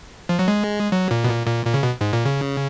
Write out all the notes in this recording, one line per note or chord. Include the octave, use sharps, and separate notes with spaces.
F3
F#3
G#3
F#3
A#2
B2
A#2
A#2
A#2
C#3
B2
G#2
A#2
C#3